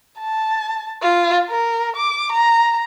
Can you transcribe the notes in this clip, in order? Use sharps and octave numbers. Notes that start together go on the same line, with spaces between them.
A5
F4
A#4
D6
A#5